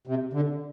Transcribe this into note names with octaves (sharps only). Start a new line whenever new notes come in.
C3
D3